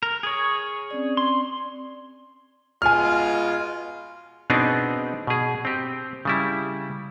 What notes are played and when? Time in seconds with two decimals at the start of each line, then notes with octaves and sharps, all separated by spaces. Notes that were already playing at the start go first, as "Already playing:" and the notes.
0.03 A#4
0.23 G#4 C#5
0.91 C4 C#4 D5
1.17 C6
2.82 B2 G#3 F4 G#5 F6
4.50 B2 B3 C4 D4 D#4 G#4
5.27 B2 G#4
5.65 C4 G4
6.25 C#3 G3 E4